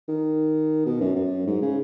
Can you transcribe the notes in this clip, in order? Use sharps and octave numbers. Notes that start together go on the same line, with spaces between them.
D#3
B2
F#2
F#2
G#2
C#3